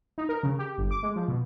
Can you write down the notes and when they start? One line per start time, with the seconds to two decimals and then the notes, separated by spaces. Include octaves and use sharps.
0.18 D#4
0.29 A#4
0.43 C#3
0.59 G4
0.78 G1
0.91 D6
1.03 G#3
1.16 F3
1.28 B2